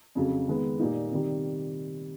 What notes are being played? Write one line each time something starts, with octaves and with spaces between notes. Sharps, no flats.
F2 C#3 F#3
D#3 G#3 B3
A#2 G3 A#3 D#4
C3 D#3 G3